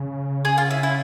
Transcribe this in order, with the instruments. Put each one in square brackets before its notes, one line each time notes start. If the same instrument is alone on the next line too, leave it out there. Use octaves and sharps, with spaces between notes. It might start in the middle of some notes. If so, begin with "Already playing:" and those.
Already playing: [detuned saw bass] C#3
[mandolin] G#4
F4
E4
E4